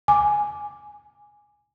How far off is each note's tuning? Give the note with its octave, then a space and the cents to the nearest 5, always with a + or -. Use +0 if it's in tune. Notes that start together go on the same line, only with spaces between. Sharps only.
G#5 +0 D6 +0